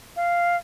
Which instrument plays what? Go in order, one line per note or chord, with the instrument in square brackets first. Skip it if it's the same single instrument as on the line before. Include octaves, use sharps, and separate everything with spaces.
[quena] F5